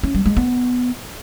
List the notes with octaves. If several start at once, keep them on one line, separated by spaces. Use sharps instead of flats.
C#4
G3
G#3
B3